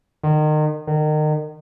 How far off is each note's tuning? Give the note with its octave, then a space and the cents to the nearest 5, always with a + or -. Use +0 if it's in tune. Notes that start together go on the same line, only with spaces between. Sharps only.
D#3 -30
D#3 -30